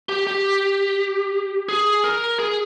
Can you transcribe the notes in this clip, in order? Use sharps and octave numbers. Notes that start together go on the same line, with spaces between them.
G4
G4
G#4
A#4
G#4